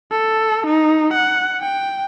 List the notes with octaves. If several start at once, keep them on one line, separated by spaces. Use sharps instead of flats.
A4
D#4
F#5
G5